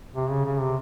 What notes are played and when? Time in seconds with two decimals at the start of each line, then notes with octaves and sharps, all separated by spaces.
0.15 C3
0.30 C#3
0.45 C#3
0.60 C3